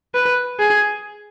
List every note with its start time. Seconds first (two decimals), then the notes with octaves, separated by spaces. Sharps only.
0.14 B4
0.59 G#4